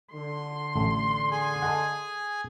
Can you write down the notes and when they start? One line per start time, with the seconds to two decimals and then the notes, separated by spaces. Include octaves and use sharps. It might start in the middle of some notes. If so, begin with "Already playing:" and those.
0.13 D3 C6
0.76 A1 A3
1.31 G#4 G#5
1.62 A4 D#5 F#5